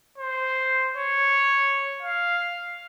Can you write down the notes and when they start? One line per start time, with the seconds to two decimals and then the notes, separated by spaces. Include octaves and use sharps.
0.18 C5
0.97 C#5
2.03 F5